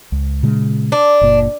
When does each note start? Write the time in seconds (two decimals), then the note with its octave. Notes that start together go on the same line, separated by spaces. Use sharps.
0.12 C#2
0.43 A#2 C#3 G#3
0.92 D4
1.21 F#1 A#2